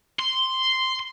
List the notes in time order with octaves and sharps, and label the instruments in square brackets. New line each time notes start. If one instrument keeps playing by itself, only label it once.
[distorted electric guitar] C6